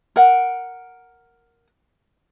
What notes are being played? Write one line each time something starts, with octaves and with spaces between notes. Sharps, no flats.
A#4 F#5